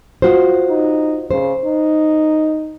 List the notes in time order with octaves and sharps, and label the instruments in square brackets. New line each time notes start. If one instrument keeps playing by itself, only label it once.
[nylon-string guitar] F4 F#4 C5
[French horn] D#4
[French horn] C#3 [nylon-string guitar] C5
[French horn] D#4